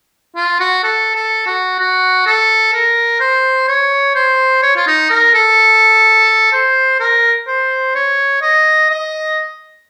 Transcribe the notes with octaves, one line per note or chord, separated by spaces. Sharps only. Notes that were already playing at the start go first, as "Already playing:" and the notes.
F4
F#4
A4
A4
F#4
F#4
A4
A#4
C5
C#5
C5
C#5
F4
D#4
A#4
A4
C5
A#4
C5
C#5
D#5
D#5